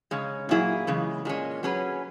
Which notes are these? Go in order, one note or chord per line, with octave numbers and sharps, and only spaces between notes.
C#3 G#3 C#4
A#2 F#3 A#3 E4 G#4
C#3 E3 G#3
A#2 G#3 C#4
F#3 C#4 G#4 B4